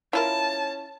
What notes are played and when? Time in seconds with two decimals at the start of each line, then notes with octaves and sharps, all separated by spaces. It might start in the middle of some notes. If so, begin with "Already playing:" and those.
0.13 C#4 E4 F4 A#4 A5